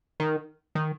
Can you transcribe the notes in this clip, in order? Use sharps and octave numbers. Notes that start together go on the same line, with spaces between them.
D#3
D#3